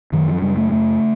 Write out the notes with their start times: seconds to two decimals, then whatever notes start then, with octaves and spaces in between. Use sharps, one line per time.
0.12 F#2 D#3
0.28 F3
0.42 C#3 G3
0.57 A3
0.72 F#2 A3